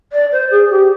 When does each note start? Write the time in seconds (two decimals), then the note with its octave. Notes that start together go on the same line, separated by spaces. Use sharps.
0.12 D5
0.32 C5
0.51 G#4
0.70 G4